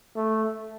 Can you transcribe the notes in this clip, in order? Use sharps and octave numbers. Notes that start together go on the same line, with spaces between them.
A3